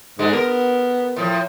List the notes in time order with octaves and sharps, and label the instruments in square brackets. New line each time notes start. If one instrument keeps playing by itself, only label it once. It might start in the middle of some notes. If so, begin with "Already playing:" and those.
[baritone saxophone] G#2 [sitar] D3 G#3
[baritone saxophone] B3 [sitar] A#4
[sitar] A2 F3